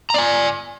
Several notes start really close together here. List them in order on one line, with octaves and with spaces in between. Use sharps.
A#5 D5 G#5